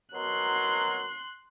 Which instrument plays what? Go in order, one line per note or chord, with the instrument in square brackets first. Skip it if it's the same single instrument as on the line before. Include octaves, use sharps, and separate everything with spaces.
[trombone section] B2 F#3 A#4 [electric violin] C6 F#6